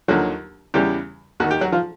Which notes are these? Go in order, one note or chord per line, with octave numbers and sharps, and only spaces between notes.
D#2 D3 F3 F#3 F#4
E2 C#3 E3 G3 G4
D#2 D#3 F#4
G4
F#3 F#4
F3 F4